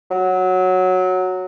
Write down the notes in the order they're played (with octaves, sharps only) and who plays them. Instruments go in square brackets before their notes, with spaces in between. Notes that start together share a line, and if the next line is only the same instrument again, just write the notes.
[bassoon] F#3